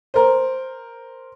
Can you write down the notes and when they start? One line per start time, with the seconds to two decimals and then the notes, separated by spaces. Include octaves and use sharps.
0.14 A#4 C5